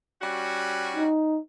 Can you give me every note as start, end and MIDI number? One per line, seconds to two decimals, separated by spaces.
0.21 1.07 55
0.21 1.07 61
0.21 1.07 66
0.96 1.39 63